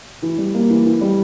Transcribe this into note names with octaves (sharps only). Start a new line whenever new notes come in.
E3
G3
A#3
E3
E3
G3